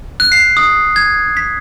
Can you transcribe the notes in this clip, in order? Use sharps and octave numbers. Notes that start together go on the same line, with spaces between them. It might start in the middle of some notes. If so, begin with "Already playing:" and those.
F#6
C7
D#6
G#6
B6